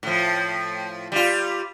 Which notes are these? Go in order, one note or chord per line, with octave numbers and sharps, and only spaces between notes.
A2 F3
G3 F4